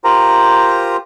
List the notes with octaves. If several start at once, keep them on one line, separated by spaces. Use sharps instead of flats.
F4 G4 A#4 C5 A#5